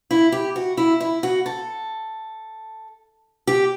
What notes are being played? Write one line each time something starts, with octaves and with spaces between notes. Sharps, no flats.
E4
G4
F#4
E4
E4
F#4
A4
G4